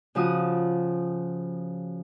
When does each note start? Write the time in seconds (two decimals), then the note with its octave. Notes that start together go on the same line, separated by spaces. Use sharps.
0.15 C#3 F3 F#4 D#6